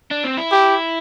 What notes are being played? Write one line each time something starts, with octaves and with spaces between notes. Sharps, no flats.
D4
C4
E4
G4